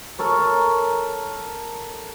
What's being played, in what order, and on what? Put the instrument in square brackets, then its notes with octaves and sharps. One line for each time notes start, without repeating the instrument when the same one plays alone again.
[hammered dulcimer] A4 A#4 C#5